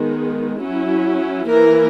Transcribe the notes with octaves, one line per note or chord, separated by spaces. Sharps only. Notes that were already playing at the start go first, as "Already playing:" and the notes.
Already playing: D#3 G#3 B3
F#3 C#4 E4
E3 A#3 E4 A#4